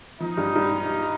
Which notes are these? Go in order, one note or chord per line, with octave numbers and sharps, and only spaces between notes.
F3 D#4
G2
G2